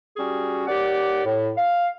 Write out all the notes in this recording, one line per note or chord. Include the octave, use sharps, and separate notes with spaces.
G3 C#4 F#4 G#4
D#2 G4 D5 F#5
A2
F5